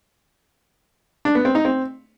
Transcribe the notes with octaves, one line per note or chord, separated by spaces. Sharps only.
D4
B3
C4
D#4
C4